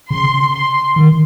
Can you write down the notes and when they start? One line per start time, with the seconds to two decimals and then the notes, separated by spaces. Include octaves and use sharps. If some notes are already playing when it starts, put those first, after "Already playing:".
0.10 C#3 C6
0.53 C6
0.96 D#3